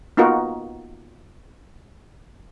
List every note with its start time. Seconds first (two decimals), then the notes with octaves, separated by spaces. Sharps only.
0.17 A#3 B3 D#4 F4 F#4 A#4